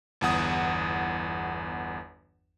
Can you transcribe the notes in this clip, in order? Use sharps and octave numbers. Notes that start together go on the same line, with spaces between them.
G1 E2 F#5 D#6